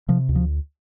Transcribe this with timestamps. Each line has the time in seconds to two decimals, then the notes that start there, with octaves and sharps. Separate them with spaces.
0.08 C3 F3
0.29 D2
0.36 F3